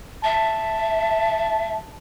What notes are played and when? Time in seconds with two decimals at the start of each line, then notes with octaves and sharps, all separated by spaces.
0.24 E5 A5